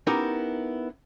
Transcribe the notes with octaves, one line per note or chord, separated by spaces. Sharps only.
B3 C#4 D#4 E4 G4 A#4